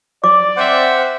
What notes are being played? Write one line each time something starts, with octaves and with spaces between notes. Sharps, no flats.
D5 D6
C4 C5 E5 F#5